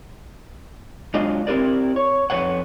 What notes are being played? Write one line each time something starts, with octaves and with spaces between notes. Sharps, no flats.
F#3 G#3 D4 F4 D#5
C4 E4 G4 A#4 D5
C#5
F2 G#3 B4 C#5 F#5